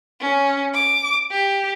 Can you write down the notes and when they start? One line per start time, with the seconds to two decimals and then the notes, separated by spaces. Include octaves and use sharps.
0.21 C#4
0.74 D6
1.31 G4